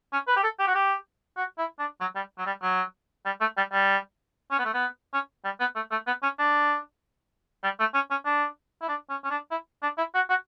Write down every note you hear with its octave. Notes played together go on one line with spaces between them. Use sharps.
C#4
B4
G4
A4
G4
F#4
G4
F#4
E4
D4
F#3
G3
F#3
G3
F#3
G3
A3
G3
G3
C#4
B3
A3
B3
C#4
G3
B3
A3
A3
B3
C#4
D4
G3
A3
C#4
C#4
D4
E4
D4
C#4
C#4
D4
E4
D4
E4
F#4
F#4